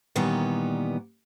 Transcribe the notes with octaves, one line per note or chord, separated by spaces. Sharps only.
A#2 D#3 E3 G3 B3 C#5